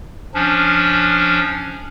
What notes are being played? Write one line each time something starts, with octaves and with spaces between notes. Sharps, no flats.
F3 C#4 D4